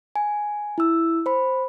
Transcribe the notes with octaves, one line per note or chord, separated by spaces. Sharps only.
G#5
E4 E6
C5 B5